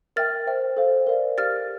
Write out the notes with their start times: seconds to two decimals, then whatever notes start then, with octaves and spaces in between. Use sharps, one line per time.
0.16 A#4 E5 G5 F6 A6
0.47 C5 E5 G5
0.77 A4 C5 F5
1.07 A#4 D5 F5
1.38 G4 A#4 F5 F6 A6